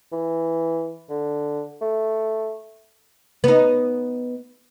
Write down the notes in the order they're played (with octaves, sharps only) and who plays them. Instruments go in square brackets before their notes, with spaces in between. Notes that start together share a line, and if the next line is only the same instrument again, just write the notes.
[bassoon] E3
D3
A3
[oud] B3 D#4